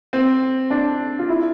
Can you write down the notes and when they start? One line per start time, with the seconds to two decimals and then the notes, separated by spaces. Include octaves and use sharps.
0.13 C4
0.70 D4
1.19 F4
1.29 E4